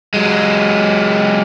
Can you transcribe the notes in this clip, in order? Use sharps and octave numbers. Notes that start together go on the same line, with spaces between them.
F#3 G#3